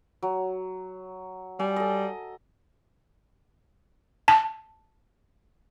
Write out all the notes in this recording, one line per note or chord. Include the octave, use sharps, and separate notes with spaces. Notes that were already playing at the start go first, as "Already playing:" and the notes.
F#3
G3 G#5
A4 D#5
A5